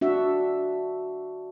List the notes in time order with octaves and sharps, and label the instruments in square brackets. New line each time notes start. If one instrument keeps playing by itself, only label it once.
[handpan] D4 F#4 E5